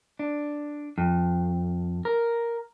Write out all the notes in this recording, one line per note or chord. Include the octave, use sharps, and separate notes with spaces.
D4
F2
A#4